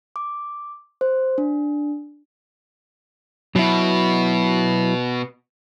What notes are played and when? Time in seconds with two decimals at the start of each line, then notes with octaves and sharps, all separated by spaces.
0.16 D6
1.01 C5
1.38 D4
3.56 B2 F#3 E4